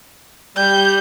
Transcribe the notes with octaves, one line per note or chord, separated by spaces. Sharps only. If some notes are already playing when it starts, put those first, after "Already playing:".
G3 G6